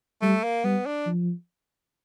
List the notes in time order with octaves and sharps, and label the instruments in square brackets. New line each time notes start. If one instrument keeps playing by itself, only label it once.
[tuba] G3 [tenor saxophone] A3
[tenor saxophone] A#3
[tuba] G3 [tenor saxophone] B3
[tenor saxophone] D4
[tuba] F3